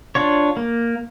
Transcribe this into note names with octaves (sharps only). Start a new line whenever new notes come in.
D4 F4 C#5
A#3